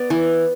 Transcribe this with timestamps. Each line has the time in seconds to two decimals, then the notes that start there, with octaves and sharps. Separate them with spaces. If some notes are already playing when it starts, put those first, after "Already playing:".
Already playing: B3 D5
0.10 E3